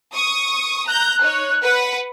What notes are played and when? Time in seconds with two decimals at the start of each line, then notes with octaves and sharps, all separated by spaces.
0.14 C#6 D#6
0.87 A#5 F#6 G6
1.22 D#4 C#5
1.64 B4 F#5